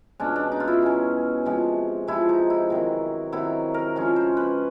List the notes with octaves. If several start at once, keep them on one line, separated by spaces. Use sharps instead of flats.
B2 G#3 C#4 D4
D4
D#4
F4
E4
B2 G#3 C#4
C3 F3 G#3
C3 F3 G#3 E4
D#4
E4
C3 D#3 F#3
C3 D#3 F#3 E4
A#4
C#3 F3 G#3 C#4
C5
B4